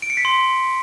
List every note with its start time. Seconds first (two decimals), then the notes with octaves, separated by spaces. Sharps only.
0.02 D7
0.10 C#7
0.17 B6
0.25 C6